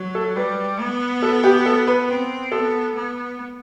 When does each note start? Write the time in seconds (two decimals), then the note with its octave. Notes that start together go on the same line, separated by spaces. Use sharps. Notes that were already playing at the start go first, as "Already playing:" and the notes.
Already playing: F#3
0.15 A4
0.36 G3 B4
0.80 B3
1.22 A4
1.44 G4
1.66 A4
1.87 B4
2.09 C4
2.51 B3 A4
2.95 B3